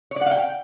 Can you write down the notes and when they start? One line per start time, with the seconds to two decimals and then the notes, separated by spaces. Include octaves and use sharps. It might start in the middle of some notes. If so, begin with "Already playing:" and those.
0.11 C#5
0.16 D5
0.21 F#5
0.26 F5
0.31 G5